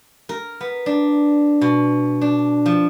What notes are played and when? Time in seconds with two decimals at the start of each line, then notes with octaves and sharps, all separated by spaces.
0.29 A#4
0.61 B3
0.86 D4
1.61 B2
2.21 D4
2.66 F3